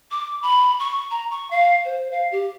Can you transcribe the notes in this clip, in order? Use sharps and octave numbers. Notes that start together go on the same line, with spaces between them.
D6
B5
C#6
A#5
C#6
F5
C5
F5
G4